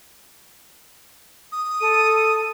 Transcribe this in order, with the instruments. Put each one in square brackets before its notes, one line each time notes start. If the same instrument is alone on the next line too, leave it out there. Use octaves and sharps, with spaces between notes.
[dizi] D#6
[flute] A4 [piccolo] D#7